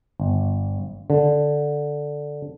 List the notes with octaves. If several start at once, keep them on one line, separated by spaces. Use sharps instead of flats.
G1
D3